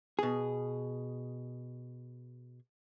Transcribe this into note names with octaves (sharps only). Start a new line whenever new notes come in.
B2 G#4